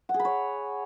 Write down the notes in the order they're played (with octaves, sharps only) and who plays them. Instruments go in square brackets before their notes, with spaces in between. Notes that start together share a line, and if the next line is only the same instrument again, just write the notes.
[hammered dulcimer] F#5
G#4
B5
C#5